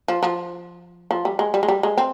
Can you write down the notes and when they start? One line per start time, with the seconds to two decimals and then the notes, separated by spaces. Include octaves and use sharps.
0.08 F3
0.23 F3
1.11 F3
1.25 G3
1.39 G#3
1.54 G3
1.63 G#3
1.68 G3
1.83 G#3
1.98 C4